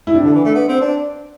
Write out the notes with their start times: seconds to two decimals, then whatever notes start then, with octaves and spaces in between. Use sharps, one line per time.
0.07 E4
0.14 C3 D4
0.24 D3
0.34 E3
0.45 A3
0.55 B3
0.69 C4
0.81 D4